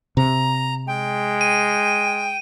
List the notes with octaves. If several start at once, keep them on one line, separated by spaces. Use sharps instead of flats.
C3 A#5
G#3 G5
D#7